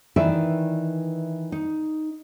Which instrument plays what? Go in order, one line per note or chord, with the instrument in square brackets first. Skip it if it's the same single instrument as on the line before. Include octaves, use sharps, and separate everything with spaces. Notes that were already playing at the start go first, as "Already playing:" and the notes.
[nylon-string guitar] D#3 E3 B4 D5 E5
D#4